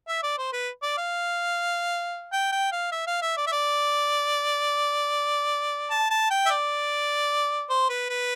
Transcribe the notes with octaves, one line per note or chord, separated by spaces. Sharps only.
E5
D5
C5
B4
D5
F5
G5
G5
F5
E5
F5
E5
D5
E5
D5
A5
A5
G5
E5
D5
C5
B4
B4